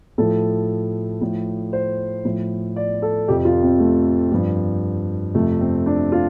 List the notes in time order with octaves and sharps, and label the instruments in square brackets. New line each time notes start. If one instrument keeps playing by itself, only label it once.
[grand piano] A2 F3 A4
A2 F3
C5
A2 F3
D5
A4
F2 C3 F3 G4
F4
C4
A3
G2 F3
F2 C3 F3 A3
C4
D4
F4